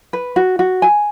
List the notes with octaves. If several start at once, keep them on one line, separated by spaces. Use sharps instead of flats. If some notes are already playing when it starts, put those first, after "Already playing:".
B4
F#4
F#4
G#5